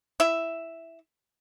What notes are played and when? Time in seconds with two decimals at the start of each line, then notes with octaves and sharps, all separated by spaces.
0.20 E4 E5